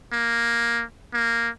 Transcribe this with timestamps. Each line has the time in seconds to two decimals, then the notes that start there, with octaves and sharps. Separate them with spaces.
0.13 A#3
1.14 A#3